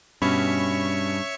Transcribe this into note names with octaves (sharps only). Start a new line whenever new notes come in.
G2 B2 C#4 C#5 E5 B5 C#6